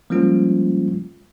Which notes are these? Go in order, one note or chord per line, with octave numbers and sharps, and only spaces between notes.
F3 G3 G#3 A#3 C#4 F4